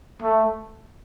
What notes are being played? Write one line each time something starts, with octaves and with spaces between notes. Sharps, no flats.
A3